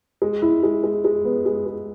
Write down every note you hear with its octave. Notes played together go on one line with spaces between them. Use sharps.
G#3
E4
G#3
G#3
G#3
B3
G#3
G#3